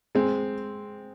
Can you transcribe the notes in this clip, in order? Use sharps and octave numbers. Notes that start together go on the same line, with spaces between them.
G#3 C4